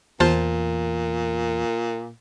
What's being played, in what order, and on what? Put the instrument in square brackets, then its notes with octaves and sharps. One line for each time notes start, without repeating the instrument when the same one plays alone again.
[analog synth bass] E2 [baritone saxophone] A#2 [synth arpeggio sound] F4 C5 A5